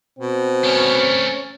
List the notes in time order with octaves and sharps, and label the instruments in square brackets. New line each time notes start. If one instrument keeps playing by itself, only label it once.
[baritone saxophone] B2 [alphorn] C4
[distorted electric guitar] A3 A#4 [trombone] C#4